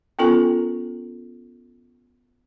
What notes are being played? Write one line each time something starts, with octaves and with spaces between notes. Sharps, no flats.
B3 C#4 F4 A4 A#4 G#5